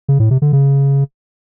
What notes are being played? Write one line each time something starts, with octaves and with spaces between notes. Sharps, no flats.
C#3
A2
C3
D3
C#3